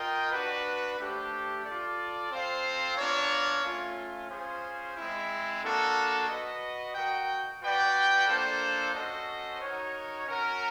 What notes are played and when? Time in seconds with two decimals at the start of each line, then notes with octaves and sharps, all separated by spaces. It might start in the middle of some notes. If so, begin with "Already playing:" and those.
Already playing: F4 A#4 D#5 G5
0.32 D4 F#4 B4
0.98 A3 D4 G4 C5
1.64 F4 A4 D5
2.31 C4 F4 A4 C5 F5
2.97 B3 D4 F4 A#4 C#5
3.63 A3 C#4 F4
4.30 C#4 F4 G#4 C5
4.96 G#3 C4 E4
5.62 A#3 D4 F#4 A4
6.29 F#4 B4 D#5
6.95 F#4 A#4 D#5 G5
7.62 F#4 B4 D5 G5
8.28 A#3 D4 F4 A4 C5
8.94 C#4 F#4 A4 C5 D#5
9.61 D#4 F#4 A#4 C#5
10.26 C#4 F#4 A#4